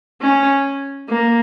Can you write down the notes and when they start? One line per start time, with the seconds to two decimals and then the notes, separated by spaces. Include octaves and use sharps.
0.21 C#4
1.09 A#3